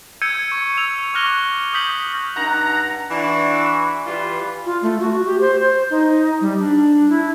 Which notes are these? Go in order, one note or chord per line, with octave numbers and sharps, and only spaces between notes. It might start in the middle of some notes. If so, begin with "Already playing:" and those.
E6 G6 G#6 C#7 D#7
C#6
E6 F7
C#6 D6 F6 F#6 A#6 G7
D#6 G6 B6 F#7
G2 D#4 F#5 A#5
E3 D4 F#4
E3 G3 F4 B4
F4
A3
F#4
G4
C5
C5
D#4
G3
D4
E4